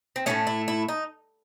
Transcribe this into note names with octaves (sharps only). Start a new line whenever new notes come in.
C4
A2 E3 A3 C#4
E4
E4
D#4